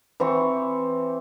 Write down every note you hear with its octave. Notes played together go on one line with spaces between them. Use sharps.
E3 C4 C#6